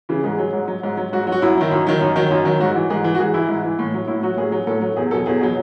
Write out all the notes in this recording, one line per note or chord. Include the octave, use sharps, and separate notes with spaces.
C#3 E3
G#2 G#4
F#3
G#2
F#3
G#2
F#3
G#2 F#4
F#3
F#4
F#2 E4
D#3 F#3
F#2
D#3 F#3
F#2
D#3 F#3
F#2
D#3 F#3
G#2 F#4
E3
G#2 G#4
E3
F#4
G#2 G#4
E3 E4
G#2
E3
A2
F#3
A2 E4
F#3 F#4
A2 G#4
F#3
A2 A4
F#3
E2 G#4
B2 F#3 A4
E2 G#4
B2 F#3